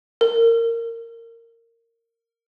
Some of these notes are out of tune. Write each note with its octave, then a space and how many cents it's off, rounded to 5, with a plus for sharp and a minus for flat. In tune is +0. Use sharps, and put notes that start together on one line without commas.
A#4 -20